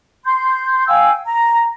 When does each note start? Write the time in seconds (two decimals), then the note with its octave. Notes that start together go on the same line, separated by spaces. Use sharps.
0.25 C6 G6
0.88 F5 G5 G#5 E6
1.25 A#5